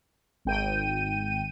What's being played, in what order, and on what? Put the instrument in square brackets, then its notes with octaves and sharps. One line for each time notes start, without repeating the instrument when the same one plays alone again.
[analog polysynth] G#1 G5 D#7